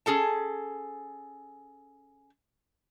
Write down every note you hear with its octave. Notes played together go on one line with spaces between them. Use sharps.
C#4 G#4 A4 A5